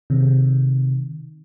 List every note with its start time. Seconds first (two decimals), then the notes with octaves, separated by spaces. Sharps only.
0.10 C3 D#3